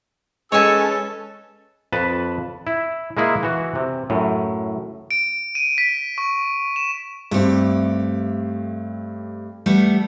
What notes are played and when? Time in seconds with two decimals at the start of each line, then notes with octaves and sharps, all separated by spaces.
0.52 G#3 C#4 A4 B4 C#5 G#5 E6
1.92 F2 B4 A5
2.67 E4
3.17 G#3 A#3 E4 G#4
3.43 E3 F#4
3.75 C3
4.10 F#2 A2
5.11 D7
5.55 D#7
5.78 B6
6.18 C#6
6.76 E7
7.31 G2 A3 C4 G4
9.66 G3 A3 B3